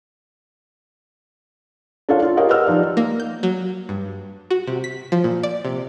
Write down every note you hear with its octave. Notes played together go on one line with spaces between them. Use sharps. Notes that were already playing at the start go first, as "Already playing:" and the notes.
D4 F4 A4 C#5 F5
F4
G4 A#4 C#5 D#5 F5
B4 D#5 F#5 E6 F6
F3 D#4 G4 D5
A#3
G6
F#3
G2
F#4
C3
B6
F3
A#2
D5
C3